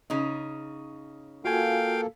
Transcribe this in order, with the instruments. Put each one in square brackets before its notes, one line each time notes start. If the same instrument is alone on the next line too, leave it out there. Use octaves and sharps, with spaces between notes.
[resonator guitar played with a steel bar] C#3 D#4
[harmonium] A#3 A4 [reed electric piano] F4 F#4 G#5 [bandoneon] F5 G5